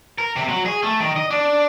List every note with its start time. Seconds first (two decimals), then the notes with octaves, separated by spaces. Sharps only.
0.18 A#4
0.36 C3
0.48 F#3
0.66 G#4
0.83 A3
1.00 D#3
1.16 D#5
1.31 D4